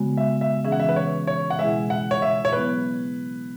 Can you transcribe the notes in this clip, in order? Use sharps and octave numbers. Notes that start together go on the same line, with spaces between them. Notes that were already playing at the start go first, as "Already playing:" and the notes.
Already playing: C#3 G#3 B3 F#4
E5
E5
E3 C#4 G#4 E5
F#5
E5
B4
C#5
C#5
F#5
B2 G#3 E4 G#4 E5
F#5
C#5
E5
C#5
F#3 B3 E4 G#4 B4